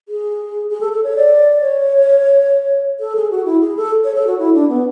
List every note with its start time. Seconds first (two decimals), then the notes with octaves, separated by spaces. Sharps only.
0.09 G#4
0.70 G#4
0.81 A4
0.93 A4
1.04 C#5
1.16 D5
1.61 C#5
3.00 A4
3.16 G#4
3.31 F#4
3.45 E4
3.61 G#4
3.77 A4
4.04 C#5
4.14 A4
4.27 F#4
4.39 E4
4.53 D4
4.69 B3